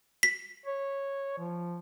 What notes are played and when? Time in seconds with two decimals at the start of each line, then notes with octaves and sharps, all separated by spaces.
0.23 B6
0.66 C#5
1.39 F3